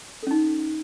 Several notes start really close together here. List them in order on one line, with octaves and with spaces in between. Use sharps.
A4 C#4 D#4